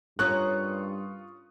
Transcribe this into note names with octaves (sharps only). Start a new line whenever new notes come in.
G2 C#4 F4 A#4 C#6 D#6 F#6